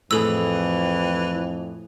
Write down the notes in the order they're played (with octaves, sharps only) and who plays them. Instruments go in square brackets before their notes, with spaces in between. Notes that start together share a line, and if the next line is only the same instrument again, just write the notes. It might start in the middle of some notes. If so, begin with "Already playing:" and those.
[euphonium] F2 [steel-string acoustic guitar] A2 G#4 [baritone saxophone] E3 [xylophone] A4 E6